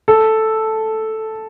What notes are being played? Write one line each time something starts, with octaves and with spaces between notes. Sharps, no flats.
A4